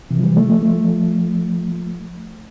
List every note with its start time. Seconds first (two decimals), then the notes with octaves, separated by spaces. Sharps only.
0.11 C3 E3
0.20 F3
0.24 E3 G3
0.37 F3 A3
0.49 F3 A3
0.62 F3 A3